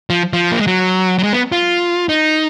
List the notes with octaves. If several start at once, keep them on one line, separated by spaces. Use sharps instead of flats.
F3
F3
A#3
G#3
F#3
F#3
G#3
B3
F4
D#4